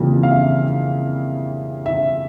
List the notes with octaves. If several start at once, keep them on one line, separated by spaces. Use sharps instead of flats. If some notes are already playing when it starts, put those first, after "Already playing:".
Already playing: F2 C#3 E3 G3 A#3
F5
E5
E5